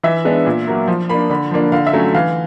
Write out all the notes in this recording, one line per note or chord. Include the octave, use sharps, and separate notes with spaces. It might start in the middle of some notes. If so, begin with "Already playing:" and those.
E3 E5
G#3 B3 D4
A#2
F#3 A#3
F3
A#3 D4 B5
D3 B5
F3 A#3 D4
D3 F5
E5
F#3 A3 C#4
E3 F5